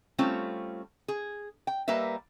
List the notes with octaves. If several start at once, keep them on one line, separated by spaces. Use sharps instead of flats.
G3 A3 C4 C#4 F4
G#4
G5
G3 A#3 A#4 B4 E5